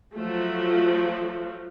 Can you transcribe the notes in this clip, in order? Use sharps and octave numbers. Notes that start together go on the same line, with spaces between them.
F3 F#3 A3